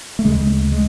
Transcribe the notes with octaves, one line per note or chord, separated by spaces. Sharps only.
A3
D2 C#3 G#3
G#3